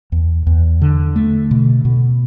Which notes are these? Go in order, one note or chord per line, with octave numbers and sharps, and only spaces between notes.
E2
E2
D3
A3
B2
B2